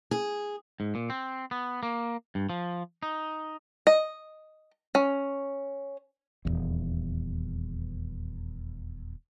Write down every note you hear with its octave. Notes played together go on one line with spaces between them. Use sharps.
G#4
G#2
A#2
C4
B3
A#3
G2
F3
D#4
D#5
C#4
D#1 G#1 E2